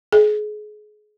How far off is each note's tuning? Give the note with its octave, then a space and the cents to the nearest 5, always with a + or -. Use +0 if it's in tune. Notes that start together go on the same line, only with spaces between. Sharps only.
G#4 +30